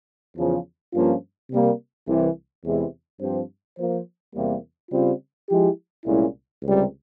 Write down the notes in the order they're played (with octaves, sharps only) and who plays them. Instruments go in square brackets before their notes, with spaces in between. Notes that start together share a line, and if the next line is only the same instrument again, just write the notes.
[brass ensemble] E2 C#3 F3
G2 F3 A#3 C#4 F4
C3 G3 A#3
C2 C3 E3
E2 C3 E3 G#3 E4
G2 F3 C4 G4 C5
F3 A#3 F4 C5
E2 C3 G3 A#3
C#3 G3 C4 F4
F3 G#3 E4 G4
C2 A#2 G#3 C#4 E4
C#2 C3 G3